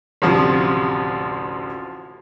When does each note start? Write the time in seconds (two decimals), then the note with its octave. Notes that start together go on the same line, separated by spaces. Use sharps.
0.22 A1 D2 C3 F3